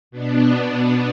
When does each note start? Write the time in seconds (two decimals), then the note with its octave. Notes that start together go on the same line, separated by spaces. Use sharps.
0.11 B2 B3 D4